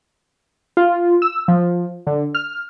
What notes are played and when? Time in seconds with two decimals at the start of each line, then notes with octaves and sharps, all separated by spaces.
0.77 F4
1.22 E6
1.48 F3
2.07 D3
2.35 F6